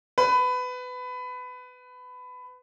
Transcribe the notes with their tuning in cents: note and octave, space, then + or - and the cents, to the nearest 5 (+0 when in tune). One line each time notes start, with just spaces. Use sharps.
B4 +20